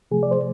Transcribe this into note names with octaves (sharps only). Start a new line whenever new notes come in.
C3 F3 A3 G#4
D5
C5